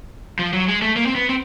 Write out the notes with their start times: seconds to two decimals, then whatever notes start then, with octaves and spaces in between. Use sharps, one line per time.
0.39 F3
0.53 F#3
0.68 G#3
0.82 A3
0.96 A#3
1.06 C4
1.15 B3
1.29 C4